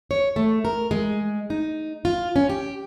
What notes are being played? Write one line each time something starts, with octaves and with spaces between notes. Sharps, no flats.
C#5
A3
A#4
G#3
D#4
F4
C#4
G4